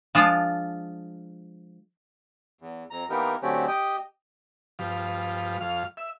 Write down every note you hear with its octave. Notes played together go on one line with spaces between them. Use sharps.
F3 G#3 D4 F4
E2
F2 A#5
E3 A#3 B3 D#4 G4 A#4
D3 F#3 A3 C4 C#4 G4
G4 D#5 G5
G2 F3
F2 F5
E5